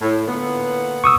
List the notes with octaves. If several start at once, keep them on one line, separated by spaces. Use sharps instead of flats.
A2
A#2 D3 B3
C#6 D#6 E6